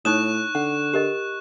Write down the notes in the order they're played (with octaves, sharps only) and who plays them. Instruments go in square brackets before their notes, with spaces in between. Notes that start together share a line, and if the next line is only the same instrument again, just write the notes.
[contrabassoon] A2 [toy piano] D#4 C#5 D#6 [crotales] C#6 F#6 E7
[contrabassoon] D3 [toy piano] F#5
[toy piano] G4 A#4 D#5